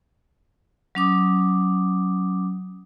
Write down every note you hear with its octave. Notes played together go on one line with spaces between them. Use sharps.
F#3 C#4 D6 D#6